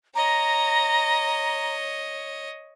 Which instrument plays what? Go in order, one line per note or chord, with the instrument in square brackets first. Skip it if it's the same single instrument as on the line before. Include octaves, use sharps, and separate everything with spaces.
[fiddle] C#5 D#5 [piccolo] A#5